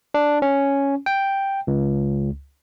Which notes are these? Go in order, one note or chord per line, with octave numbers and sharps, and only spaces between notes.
D4
C#4
G5
C#2